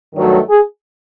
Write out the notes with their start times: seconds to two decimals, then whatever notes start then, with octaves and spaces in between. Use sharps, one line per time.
0.14 G2 D#3 F#3 A3
0.49 G#4